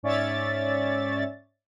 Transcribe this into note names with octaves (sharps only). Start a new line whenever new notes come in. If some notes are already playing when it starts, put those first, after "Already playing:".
G#2 C#4 C#5 D5 E5 A6